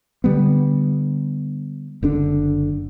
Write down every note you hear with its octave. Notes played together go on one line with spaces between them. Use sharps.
D3 G3 B3
F#1 D3 D4